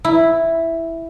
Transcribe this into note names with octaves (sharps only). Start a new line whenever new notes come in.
E4